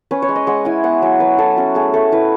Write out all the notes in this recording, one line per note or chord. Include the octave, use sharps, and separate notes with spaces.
C#4 B4
C#5
G#3
D#5
G#3 F#5
E4 G#5
B3 F#5
F#3 G#5
F#3 B4
E4 A4
C#4 F#4
A3 G#4
A3 A4
E4 B4